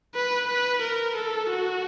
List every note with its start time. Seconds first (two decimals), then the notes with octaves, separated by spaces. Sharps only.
0.15 B4
0.48 B4
0.82 A#4
1.16 A4
1.50 F#4